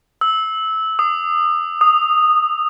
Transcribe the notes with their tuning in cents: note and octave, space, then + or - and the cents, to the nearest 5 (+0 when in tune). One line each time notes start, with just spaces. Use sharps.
E6 -15
D#6 -35
D#6 -15